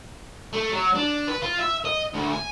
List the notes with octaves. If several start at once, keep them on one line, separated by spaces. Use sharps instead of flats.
A3
F#3
D4
B4
F4
E5
D#5
D2
G#5